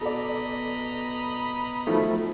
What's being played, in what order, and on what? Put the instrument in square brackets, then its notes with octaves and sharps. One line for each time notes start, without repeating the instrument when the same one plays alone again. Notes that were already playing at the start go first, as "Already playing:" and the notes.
[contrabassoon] B2 [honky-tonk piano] A4 D5 [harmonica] D#5 A#5 B5
[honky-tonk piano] D#3 F#3 [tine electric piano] F3 A3